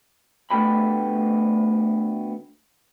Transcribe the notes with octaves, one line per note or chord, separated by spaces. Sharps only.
D2 C3 A3 B3 G4 B5